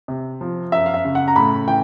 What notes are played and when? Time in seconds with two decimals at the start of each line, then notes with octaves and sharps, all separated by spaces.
0.08 C3
0.41 F3
0.72 F#2 E5
0.86 F5
0.94 E5
1.05 C#3
1.15 F#5
1.28 A#5
1.36 A2 B5
1.67 E3 G5